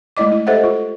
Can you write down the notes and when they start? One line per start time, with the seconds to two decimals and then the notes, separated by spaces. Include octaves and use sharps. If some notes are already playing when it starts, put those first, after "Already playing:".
0.17 G#3 A3 E4 D5 D#5 D6
0.32 E4
0.47 G4 A4 C5 D#5 E5 F#5
0.64 F4